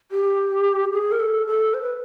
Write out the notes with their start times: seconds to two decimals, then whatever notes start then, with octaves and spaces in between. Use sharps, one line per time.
0.11 G4
0.93 G#4
1.11 A#4
1.20 A4
1.47 A4
1.74 C5
1.82 B4